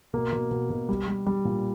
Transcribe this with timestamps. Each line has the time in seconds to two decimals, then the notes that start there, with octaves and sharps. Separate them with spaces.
0.13 B2 A#3
0.32 B2
0.51 B2
0.70 B2
0.89 G3
1.08 G3
1.26 G3
1.45 A#2